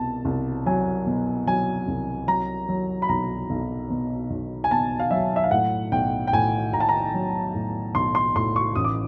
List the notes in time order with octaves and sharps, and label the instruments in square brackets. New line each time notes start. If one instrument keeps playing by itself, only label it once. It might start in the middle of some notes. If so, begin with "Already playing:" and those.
Already playing: [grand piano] C2 B2 A5
C2
F#3 G#5
B2
F#3 G#5
C2
F#3 A#5
F#3
B5
B1 A#5
B1
B2
B1
G#5
B2 A5
F5
F#3 E5
E5
F5
A2 F#5
B1 G5
G5
A2 G#5
A2 A#5
A5
A#5
F#3
A2
B1 C6
C6
A2 C6
C#6
A1 D#6
D6